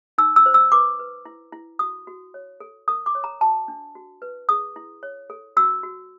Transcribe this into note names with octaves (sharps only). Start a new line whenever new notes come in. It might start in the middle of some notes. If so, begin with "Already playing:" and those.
D#4 E6
E6
C5
E6
B4 D6
B4
E4
E4
F#4 D#6
F#4
C#5
A4
A#4 D#6
D6
C#5
A#5
F#4 A5
D4
F#4
B4
G#4 D#6
E4
C#5
A4
F#4 E6
F#4